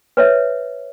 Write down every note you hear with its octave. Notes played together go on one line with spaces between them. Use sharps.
B4 C#5 E5